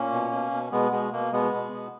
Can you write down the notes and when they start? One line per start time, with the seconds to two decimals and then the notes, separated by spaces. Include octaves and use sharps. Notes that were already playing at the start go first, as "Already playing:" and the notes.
Already playing: A#2 A#3 C#4
0.12 B2
0.32 B2
0.51 B2
0.72 B2 G#3 B3
0.91 B2 G#3
1.12 B2 A#3
1.32 B2 G#3 B3
1.52 B2
1.72 B2